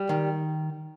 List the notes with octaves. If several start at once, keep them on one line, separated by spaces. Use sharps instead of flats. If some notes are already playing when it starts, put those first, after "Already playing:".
Already playing: G3
D#3